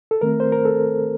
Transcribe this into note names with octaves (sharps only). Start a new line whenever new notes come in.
A4
D#3 A3 C4 A#4
C5
A#4
A4